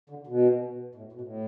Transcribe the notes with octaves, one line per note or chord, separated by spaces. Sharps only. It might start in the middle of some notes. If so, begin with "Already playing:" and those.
D3
B2
A2
B2
A2